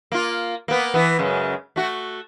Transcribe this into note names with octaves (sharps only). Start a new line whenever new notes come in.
A#3 F4
A#3 B3
E3 B3
F#2 C#3 G#3
A3 F#4